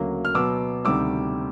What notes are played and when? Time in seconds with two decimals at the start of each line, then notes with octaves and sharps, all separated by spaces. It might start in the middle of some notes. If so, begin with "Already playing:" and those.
Already playing: D2 C#3 F#3 A#3
0.25 F6
0.35 B2 F#3 B3 D6 E6
0.85 D2 C3 D#3 G3 D6 E6